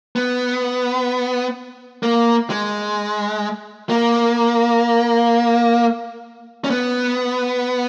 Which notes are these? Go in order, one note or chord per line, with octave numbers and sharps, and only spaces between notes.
B3
A#3
G#3
A#3
C#4
B3